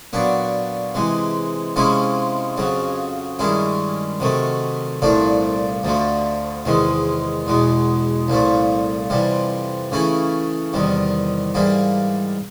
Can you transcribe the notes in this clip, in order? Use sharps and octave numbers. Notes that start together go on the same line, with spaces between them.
A#2 F#3 B3 D4
C3 E3 G#3
C3 F3 G#3 C#4 E4
F2 C#3 F#3
G2 D#3 G#3 C#4 E4
C3 D#3 F#3 A3
C2 A#2 F3 A3 D4
D2 D3 F3 A3
E2 C3 D#3 G#3
E2 B2 G#3
C2 A#2 F3 A3
F2 C3 E3 G3
C#3 E3 A3 C#4 E4
E2 C3 D#3 G3
G#2 E3 G3 A#3